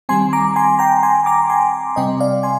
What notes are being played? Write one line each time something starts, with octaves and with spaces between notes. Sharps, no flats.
D#3 G3 C4 G#5 C6
A#5 D6
G#5 C6
G5 A#5
G#5 C6
A#5 D6
G#5 C6
C3 G3 C4 D#5 G5
D5 F5
G#5 C6